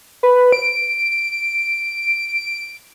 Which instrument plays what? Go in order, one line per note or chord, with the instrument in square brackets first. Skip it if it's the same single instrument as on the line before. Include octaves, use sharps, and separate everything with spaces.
[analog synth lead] B4
D7